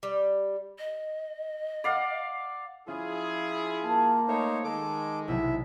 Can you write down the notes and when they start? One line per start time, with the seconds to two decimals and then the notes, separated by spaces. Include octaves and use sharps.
0.03 G3
0.79 D#5
1.84 D5 F5 F#5
2.88 F3 C#4 E4 F4 G#4
3.84 A#3 A5
4.28 A3 D#4 C5 C#5
4.64 D#3 G#3 A4 D6
5.28 B1 C3 F#3 E4 E5